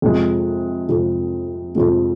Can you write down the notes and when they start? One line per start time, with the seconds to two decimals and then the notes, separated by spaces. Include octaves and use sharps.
0.02 F2 C3 F3 G#3
0.89 F2 C3 F3 G#3
1.75 F2 C3 F3 G#3